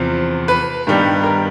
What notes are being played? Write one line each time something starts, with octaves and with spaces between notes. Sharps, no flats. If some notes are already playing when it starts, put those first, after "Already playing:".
Already playing: E2 C3 F3
B4
G2 D#3 G3 B3
A#4